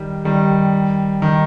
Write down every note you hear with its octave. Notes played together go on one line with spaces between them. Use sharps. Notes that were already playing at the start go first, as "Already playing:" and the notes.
Already playing: D#3 G3
D#3 G3
D#3